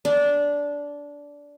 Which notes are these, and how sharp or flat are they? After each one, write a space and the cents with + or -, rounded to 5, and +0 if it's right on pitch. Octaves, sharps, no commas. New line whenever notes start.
D4 -15